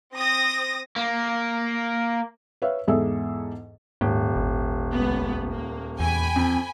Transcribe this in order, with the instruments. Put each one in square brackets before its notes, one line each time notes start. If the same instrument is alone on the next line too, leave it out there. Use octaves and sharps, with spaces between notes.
[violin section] C4 D#6 A#6
[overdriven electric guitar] A#3
[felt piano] B4 C#5 E5 F5
E2 G#2 G#4 A4 E5
[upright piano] D#1 [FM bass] G#2
[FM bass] G#1
[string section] C#2 B3
A#3
[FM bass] E2 [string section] G5 G#5 B5
[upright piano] F2